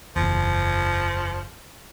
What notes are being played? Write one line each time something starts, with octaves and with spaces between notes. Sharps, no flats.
F#1 E2 F3